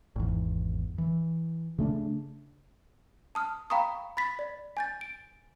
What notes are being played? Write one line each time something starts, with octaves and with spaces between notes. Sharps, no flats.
G#1 E2
E3
C#3 A3 C#4 D4
A5 D#6 F6
F5 G5 A#5 B5 C#6 D#6
B5 A6 B6
D5
G#5 G6 A6
D7